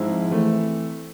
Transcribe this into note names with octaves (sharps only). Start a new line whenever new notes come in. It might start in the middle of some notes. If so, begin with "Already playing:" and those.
Already playing: G#2 F3 G#3 C4 E4
E3 A3 C4